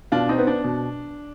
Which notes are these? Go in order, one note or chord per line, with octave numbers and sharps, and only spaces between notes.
B2 D4 F4
C4 D#4
B3
D4
B2